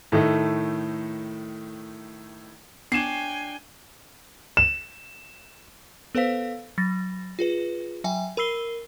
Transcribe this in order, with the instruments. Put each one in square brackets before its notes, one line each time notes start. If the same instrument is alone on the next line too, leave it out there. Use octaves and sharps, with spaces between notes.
[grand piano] A2 D#3 A3
[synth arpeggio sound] B3 [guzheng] D4 C#5 [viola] G5 G#5 [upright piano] C7 E7
[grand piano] E7
[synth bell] B3 A4 B4 C5 F5 B6
F#3 A6 A#6
F4 G#4 B4
F#3 E5 G5 G#5
A#4 B5 E6 C7 G7